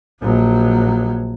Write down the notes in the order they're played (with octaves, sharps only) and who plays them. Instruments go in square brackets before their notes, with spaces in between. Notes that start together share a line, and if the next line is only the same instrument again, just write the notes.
[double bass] A#1 F#3